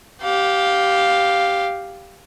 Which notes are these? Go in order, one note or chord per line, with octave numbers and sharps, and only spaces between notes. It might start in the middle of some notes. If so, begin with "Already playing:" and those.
G4 F5